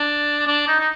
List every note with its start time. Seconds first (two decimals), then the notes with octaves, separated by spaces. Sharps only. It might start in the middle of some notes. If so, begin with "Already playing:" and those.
Already playing: D4
0.47 D4
0.68 D#4
0.80 D#4